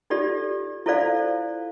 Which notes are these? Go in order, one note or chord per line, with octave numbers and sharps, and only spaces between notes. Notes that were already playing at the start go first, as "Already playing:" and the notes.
D#4 F4 G4 A4 D5
E4 F4 A4 C5 D5 F5